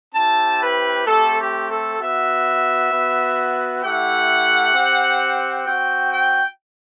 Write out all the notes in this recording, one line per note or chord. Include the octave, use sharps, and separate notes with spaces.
C4 E4 G4 A5
B4
A3 C4 G4 A4
G4
A4
B3 F#4 E5
B3 F#4
A3 E4 G4 F#5
C4 G4
C4 F#4 G5
G5